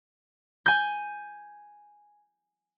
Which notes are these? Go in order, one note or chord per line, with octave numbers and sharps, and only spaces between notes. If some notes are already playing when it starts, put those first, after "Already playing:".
G#5 G6